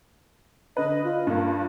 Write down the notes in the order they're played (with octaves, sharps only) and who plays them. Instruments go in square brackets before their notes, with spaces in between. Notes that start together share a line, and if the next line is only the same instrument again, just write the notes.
[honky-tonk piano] D3 B4 [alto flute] D#5
[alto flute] F4
[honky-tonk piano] G2 A#3